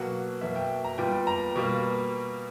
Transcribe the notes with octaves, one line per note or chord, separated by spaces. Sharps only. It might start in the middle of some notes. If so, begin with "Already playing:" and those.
Already playing: B2 F#3 A#3 F#5
B2 F#3 A#3 E5
G5
A#5
A#2 G3 B3 G5
A#5
B2 G3 A#3